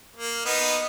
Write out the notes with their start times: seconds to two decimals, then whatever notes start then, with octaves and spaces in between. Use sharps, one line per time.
0.16 A#3
0.46 B3 D#4